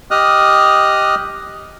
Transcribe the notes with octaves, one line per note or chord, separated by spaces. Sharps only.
G4 D#5 D#6 F6 F#6